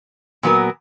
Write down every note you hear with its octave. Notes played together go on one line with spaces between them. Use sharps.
A#2 F#3 B3 F#4 A#4